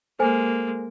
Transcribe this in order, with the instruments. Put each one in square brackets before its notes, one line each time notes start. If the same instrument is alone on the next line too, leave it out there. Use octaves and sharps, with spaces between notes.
[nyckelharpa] G#3 A#3 [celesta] A4 C5 G#5